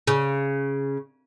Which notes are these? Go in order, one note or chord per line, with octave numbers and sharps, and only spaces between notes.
C#3